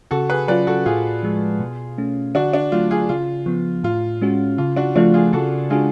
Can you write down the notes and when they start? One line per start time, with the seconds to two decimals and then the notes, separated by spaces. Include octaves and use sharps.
0.11 C#3 F#4 A4
0.29 G#4 B4
0.48 F#3 C#4 F4 B4 D5
0.67 F#4 A4
0.86 A2 F4 G#4
1.23 F3 G#3
1.60 B2
1.98 A3 C#4
2.35 D3 D4 F#4
2.53 D4
2.72 F#3 A3 F4
2.91 F4 G#4
3.09 C#3 F4
3.46 F3 B3
3.84 A2 F4
4.21 G#3 C#4 F#4
4.58 C#3 F4
4.76 D4 F#4
4.96 F3 A3 D4 F4 F#4
5.14 F4 G#4
5.33 C#3 F#4 A4
5.70 G#3 D4 F4 F#4 G#4